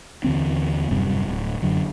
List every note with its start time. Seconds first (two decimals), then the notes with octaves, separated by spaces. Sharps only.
0.24 D#2 D3 E3 C4
0.91 D1 F#2 C3 G3
1.28 D1
1.62 F#2 D3 F#3